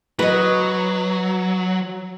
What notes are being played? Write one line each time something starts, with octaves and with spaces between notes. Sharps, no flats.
F#3 B4 D#5